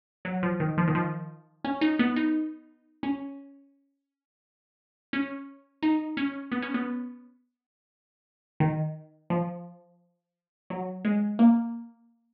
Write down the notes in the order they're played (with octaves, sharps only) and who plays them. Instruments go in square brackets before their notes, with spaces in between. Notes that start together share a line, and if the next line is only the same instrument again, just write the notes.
[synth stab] F#3
F3
D#3
F3
D#3
F3
C#4
D#4
B3
D#4
C#4
C#4
D#4
C#4
B3
C#4
B3
D#3
F3
F#3
G#3
A#3